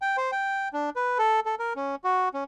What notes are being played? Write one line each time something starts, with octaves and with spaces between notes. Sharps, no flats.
G5
C5
G5
D4
B4
A4
A4
A#4
C#4
F#4
C#4